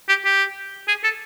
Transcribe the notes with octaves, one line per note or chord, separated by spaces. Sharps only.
G4
G4
G#4
A4